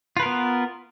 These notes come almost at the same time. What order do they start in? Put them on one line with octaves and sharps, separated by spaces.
F4 B4 A#4 B3